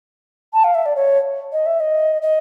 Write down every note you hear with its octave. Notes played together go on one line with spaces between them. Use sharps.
A5
F5
E5
D5
C#5
D#5
E5
D#5
D#5